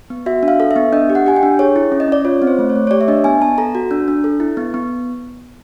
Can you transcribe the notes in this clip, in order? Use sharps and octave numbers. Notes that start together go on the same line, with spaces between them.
B3
F#4 E5
D4
F5
A4
E5
B3
D4 D#5
G4
F#5
G4 G#5
G5
D4
G#4 C#5
E4
C#4
D#5
C#4 D5
F4 C#5
C4
C5
A3
C#5
A3
C#5
G4 D5
E5
D4 D#5
B3 G#5
B3 A5
A4 A#5
F#4
D4
D4
A4
E4
B3
B3